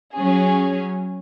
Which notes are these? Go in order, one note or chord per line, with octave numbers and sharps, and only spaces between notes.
F#3 C#4 G#4